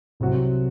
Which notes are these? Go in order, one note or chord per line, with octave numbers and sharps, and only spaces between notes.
C2 C3 F#3 C4 F#4